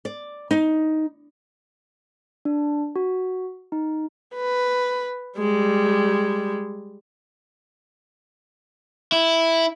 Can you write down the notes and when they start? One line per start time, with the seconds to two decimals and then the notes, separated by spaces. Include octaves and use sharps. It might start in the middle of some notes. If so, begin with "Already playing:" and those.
0.05 D5
0.51 D#4
2.45 D4
2.96 F#4
3.72 D#4
4.36 B4
5.38 G3 G#3
9.12 E4